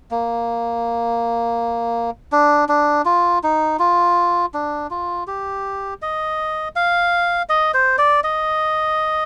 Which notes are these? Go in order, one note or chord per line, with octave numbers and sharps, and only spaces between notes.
A#3
D4
D4
F4
D#4
F4
D4
F4
G4
D#5
F5
D#5
C5
D5
D#5